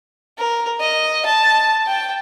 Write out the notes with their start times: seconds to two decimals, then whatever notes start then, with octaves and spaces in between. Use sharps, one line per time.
0.38 A#4
0.80 D#5
1.26 A5
1.86 G5